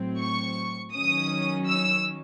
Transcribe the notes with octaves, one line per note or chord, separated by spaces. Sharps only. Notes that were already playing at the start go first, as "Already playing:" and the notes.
Already playing: A2 F#3 C4
C#6
D#3 F#3 C#4 D#6
E6